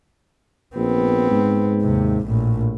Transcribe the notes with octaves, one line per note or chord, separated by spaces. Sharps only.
A#1 B3 C4
G#2
D#2 C3
A#1 A2